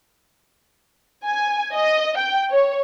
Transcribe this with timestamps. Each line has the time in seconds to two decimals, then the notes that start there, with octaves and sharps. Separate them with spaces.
1.25 G#5
1.73 D#5
2.18 G5
2.50 C#5